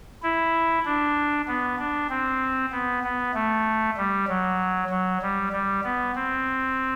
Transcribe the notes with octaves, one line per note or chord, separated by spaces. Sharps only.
E4
D4
B3
D4
C4
B3
B3
A3
G3
F#3
F#3
G3
G3
B3
C4